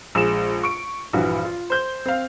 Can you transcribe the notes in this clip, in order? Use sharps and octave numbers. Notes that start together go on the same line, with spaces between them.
A#1 G#3 E7
C#6 D7
A#1 G2 E3 F#4
F4
C5 G6 G7
C4 F5